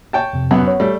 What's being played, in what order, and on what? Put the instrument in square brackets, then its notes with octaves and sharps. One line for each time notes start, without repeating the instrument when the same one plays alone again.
[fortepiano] C#5 G5 A5
[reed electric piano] F2 C3
[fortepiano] F#2 B3
[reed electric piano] C#5
[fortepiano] G3 A3